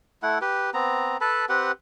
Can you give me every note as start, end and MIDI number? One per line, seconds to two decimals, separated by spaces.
0.23 0.38 57
0.23 0.38 64
0.23 0.38 78
0.42 0.70 67
0.42 0.70 71
0.74 1.17 59
0.74 1.17 60
0.74 1.17 82
1.21 1.45 69
1.21 1.45 71
1.21 1.45 81
1.21 1.45 83
1.49 1.72 60
1.49 1.72 67
1.49 1.72 71
1.49 1.72 78